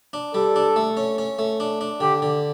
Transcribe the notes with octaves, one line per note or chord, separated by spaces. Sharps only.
D4
G3 A4
D4
A3
C#4
C#4
A3
D4
D4
D3 G4
D3